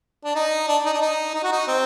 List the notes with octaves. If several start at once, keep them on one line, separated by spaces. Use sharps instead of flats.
D4
D#4
D4
D#4
D4
D#4
D#4
F#4
D#4
C4